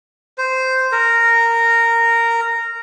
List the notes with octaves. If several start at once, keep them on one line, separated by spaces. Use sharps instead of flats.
C5
A#4